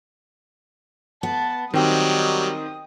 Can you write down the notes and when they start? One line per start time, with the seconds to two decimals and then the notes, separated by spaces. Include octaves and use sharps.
1.23 B3 A5
1.74 D#3 F#3 G3 C4 D#5 G5 D#6